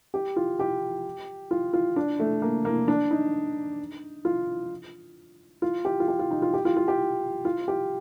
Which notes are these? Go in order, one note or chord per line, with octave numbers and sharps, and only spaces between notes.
G4
F4
G4
F4
F4
D4
A3
A#3
A#3
D4
D#4
F4
F4
G4
F4
G4
F4
D#4
F4
G4
F4
F4
G4
F4
G4